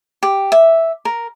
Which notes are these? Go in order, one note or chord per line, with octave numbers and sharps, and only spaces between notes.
G4
E5
A#4